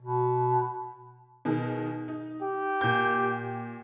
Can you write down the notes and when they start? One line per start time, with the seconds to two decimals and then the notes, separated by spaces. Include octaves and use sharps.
0.02 B2
1.45 B2 D#3 G#4
2.08 D#4
2.42 G4
2.81 A#2 G6